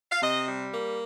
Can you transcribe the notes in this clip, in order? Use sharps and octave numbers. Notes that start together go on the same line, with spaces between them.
F5
C3 D#5
G3
A#3